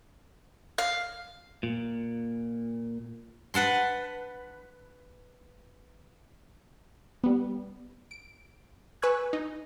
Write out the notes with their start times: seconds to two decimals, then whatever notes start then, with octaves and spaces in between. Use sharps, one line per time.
0.78 F5
1.63 A#2
3.54 B4 F#5 A5 C6
7.24 G3 B3
8.11 D7
9.02 B4 G#5 C#6 E6 F#6 G#6
9.33 D#4